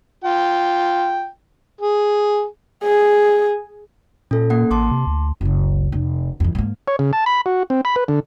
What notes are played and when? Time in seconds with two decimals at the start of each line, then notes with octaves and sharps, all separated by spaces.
0.24 F4 G5
1.81 G#4
2.84 G#4
4.31 A#2 C#4 A4
4.50 A#3 F#5
4.71 A1 A5 C6 D6
4.91 C3
5.07 D2
5.41 F#1 C#2
5.92 F1
6.40 F2 E3
6.55 G#2 A#3
6.88 C#5
6.99 C#3
7.13 A5
7.26 B5
7.46 F#4
7.70 C4
7.85 B5
7.96 B4
8.08 D3